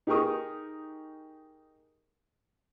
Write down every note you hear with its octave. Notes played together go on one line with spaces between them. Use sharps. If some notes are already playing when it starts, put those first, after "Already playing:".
D#4 G4 G#4 A#4 C#6 D#6